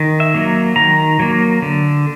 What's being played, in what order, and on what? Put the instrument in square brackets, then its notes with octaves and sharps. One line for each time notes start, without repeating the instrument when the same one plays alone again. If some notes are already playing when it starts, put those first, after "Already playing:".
Already playing: [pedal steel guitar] D#3
E5
F#3 A#3
D#3 A#5
F#3 A#3
D3